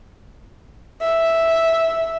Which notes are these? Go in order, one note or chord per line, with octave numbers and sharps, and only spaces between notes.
E5